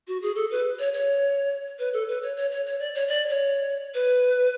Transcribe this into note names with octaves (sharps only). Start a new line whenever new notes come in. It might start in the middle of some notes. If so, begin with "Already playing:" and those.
F#4
G#4
A4
B4
C#5
C#5
B4
A4
B4
C#5
C#5
C#5
C#5
D5
C#5
D5
C#5
B4